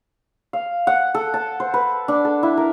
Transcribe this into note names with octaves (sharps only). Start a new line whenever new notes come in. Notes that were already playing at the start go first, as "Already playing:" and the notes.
F5
F#5
A4
A5
C5
B4
D4
A4
E4
A#4